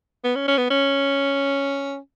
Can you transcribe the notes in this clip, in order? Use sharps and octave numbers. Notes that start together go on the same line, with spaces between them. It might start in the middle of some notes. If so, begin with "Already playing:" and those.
B3
C#4
C#4
B3
C#4